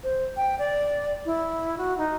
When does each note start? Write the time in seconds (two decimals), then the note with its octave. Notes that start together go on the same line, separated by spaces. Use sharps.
0.04 C5
0.37 G5
0.59 D5
1.25 E4
1.78 F#4
1.98 D#4